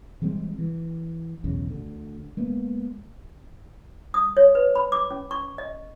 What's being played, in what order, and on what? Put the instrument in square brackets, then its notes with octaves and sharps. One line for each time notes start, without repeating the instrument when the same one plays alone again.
[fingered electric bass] E3 G3 G#3 C4
E3
B1 E2 C#3
D2 D3
G#3 A#3 B3
[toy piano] D#6
C#5
B4
B5
D6
C#4
C#6
D#5